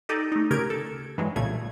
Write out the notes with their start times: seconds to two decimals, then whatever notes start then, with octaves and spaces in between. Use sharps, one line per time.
0.09 D#4 G4 A4 D5 D#5
0.32 A3 D#4
0.50 D2 C#3 G4 A#4 G#6 D7
0.70 A4
1.18 G2 E3 F#3 G#3
1.36 B1 A#2 C#3 G3 A3 G#6